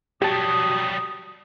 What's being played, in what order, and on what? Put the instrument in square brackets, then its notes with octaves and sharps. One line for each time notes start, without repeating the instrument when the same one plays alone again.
[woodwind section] B2 F#4 D#6 [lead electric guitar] F#3 G3 [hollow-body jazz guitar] G4 A5